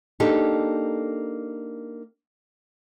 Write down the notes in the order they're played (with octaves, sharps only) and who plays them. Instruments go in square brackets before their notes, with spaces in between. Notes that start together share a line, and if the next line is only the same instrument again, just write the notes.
[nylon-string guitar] A#3 D4 D#4 G4 A4